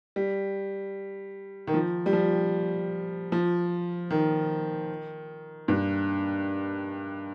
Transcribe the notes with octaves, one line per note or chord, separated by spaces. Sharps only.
G3
D#3
F3
G3
F3
F3
D#3
G2